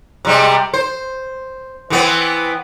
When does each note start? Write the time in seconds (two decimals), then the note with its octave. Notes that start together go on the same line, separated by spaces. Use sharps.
0.25 C3 G3 G#3
0.74 C5
1.90 E3 B3 C4